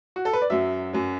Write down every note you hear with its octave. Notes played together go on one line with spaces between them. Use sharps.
F#4
A4
B4
D5
F#2 F#3 E5
F#2 F#3